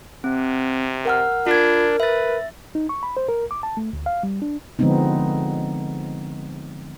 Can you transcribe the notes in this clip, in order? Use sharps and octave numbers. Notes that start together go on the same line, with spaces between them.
C3 C4
A#4 F#5 F6
D4 F4 A#4 G#6
B4 E5 A6
D#4
C#6
B5
C5
A#4
D6
A5
A3
D2
F5
G3
D4
D3 F3 G#3 B3 C4 D#4